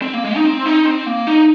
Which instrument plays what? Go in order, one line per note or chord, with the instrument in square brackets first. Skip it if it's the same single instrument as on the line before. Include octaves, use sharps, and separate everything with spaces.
[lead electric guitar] C4
A#3
G#3
D#4
C4
D#4
C4
A#3
D#4